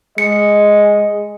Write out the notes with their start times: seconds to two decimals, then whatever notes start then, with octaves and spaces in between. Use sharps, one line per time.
0.18 G#3 D#5 C#7